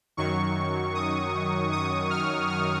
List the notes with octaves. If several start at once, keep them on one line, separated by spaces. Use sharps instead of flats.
F#2 D#3 F#3 C#6
D#6
D#6
F6
F6